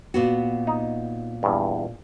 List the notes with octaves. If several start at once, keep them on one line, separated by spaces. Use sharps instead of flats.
A#2 B3 F#4
D#4
E2 G2